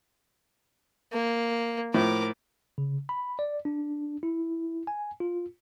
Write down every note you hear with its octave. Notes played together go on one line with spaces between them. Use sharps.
A#3
A2 F3 A#4 D6
C#3
B5
D5
D4
E4
G#5
F4